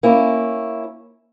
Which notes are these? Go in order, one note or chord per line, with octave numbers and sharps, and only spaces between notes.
A#3 C#4 E4